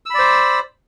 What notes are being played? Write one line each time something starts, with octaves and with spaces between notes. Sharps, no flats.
C5 D5 B5 E6